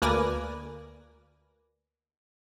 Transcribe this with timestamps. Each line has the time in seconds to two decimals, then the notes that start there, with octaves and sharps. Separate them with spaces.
0.02 D2 A#3 B4 D5 G#5 A#6